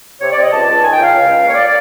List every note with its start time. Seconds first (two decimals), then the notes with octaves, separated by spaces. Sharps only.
0.21 C3 C#5
0.31 D5
0.37 C3 D#5
0.52 C#2 A5
0.67 C#2
0.82 D#3 G#5
0.92 G5
0.97 C#2 F5
1.12 C#2
1.27 C#2
1.43 A#3 C#5
1.54 D5
1.58 A#3
1.64 D5